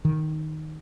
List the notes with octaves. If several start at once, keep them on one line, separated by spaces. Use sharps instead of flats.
D#3